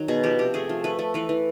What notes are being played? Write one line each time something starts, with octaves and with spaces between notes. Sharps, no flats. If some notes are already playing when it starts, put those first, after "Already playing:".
Already playing: D#3 F#3
B2 G#4
F3 G4
C3 G4
A3 G#4
F3
A3 B4
A3
E3 B4
E3